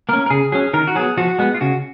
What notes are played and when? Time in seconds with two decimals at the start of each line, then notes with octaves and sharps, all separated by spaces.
0.09 A#3 C#4 A#4
0.26 A#4
0.30 C#3 G#4
0.52 F#3 C#4 G#4
0.73 D#3 A#4
0.87 F#4
0.95 F#3 B3 G#4
1.17 F3 F#4
1.39 G#3 B3
1.54 F4
1.61 C#3 F#4